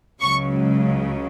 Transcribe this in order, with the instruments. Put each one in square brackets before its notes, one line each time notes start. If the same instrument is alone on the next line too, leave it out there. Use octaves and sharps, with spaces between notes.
[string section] C#2 C#3 F#3 C#6